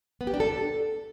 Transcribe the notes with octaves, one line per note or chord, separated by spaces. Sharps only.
B3
G4
D4
A4